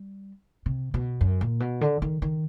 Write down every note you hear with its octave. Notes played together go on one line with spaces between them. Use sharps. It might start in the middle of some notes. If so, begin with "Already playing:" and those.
Already playing: G3
C3
B2
F#2
A#2
B2
D3
D#3
D#3